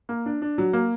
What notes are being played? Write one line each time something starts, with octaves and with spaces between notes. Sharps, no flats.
A#3
D4
D4
F#3
A#3